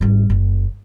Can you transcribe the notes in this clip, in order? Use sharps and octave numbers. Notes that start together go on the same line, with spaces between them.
G#1 G3
F#1